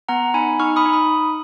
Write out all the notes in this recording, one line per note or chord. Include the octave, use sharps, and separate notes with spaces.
B3 F#5 A#5
D#4 G#5 B5
D#4 C#6 F6
B5 D#6
D#4
B5 D#6